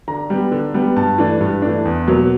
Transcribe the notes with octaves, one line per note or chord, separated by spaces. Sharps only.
D3 A#5
G3 B3
D3
G3 B3
G2 A5
E3 A3 D4
G2
E3 A3 D4
E2
B2 F#3 A#3